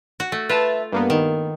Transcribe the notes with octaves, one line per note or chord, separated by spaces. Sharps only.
F#4
A3
F4 B4 E5 A5
G2 A#3 B3
D#3